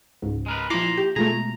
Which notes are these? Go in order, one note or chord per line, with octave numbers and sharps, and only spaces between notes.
C#2 G#2
G#3 A#4 B4
A#2 F3 E4 F4 A#5 C6 D6
G4
B2 G#3 A3 F4 G#4 A#5